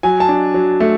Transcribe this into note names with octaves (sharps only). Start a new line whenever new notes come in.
F#3 G#5
A5
D4
F#3
A3